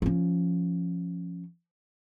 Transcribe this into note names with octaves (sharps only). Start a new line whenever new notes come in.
F3 C#4